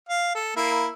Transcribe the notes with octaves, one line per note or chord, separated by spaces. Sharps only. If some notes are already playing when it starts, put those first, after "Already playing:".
F5
A4
A#3 E4